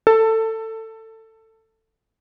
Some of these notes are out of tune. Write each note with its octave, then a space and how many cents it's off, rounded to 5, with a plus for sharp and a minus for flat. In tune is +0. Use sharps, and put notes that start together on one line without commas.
A4 +20